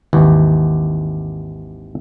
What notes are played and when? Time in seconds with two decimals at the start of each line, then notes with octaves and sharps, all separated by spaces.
0.13 G#1 D#2 E3